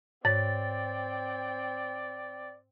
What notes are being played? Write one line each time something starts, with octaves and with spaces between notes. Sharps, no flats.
G#2 C4 C#5 D5 G5 A6